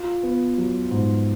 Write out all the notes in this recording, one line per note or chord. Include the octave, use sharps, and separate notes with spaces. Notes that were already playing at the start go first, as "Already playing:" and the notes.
Already playing: F4
B3
F#3
G#2